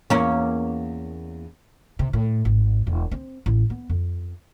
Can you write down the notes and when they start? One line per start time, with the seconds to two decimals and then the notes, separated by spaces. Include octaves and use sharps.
0.10 E2 A#3 C#4
1.99 C3
2.13 A2
2.45 G#1
2.87 E1
3.12 C4
3.46 A1
3.70 B3
3.90 F2